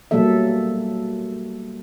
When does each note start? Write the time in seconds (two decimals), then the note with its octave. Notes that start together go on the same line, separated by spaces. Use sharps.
0.11 B2 F#3 G3 A#3 A4 E5